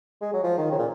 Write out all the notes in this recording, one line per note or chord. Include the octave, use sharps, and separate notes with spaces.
G#3
F#3
F3
D#3
C#3
A#2